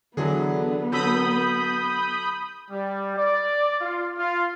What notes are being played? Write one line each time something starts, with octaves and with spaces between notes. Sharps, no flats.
D3 E3 F#3 B3 G#4
D3 F#3 B5 D#6 E6 G6
G3
D5
F4
F4